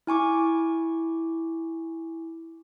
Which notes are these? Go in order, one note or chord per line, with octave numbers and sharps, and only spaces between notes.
E4 G#5 C#6 D6